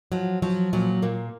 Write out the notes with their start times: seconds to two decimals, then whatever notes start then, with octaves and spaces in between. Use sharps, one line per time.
0.12 F3 F#3
0.42 F3 F#3
0.73 A#2 F#3
1.02 A#2 A#3